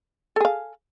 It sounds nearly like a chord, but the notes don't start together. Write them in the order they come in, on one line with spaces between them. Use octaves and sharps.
A4 G#4 F5